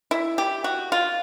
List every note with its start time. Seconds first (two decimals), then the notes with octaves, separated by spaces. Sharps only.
0.11 E4
0.38 G4
0.64 F#4
0.92 F4